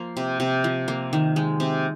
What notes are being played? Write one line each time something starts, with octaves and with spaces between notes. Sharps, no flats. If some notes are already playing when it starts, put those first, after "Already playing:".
Already playing: F3 A#3
C3
C3
F3
A#3
D#3
G#3
C3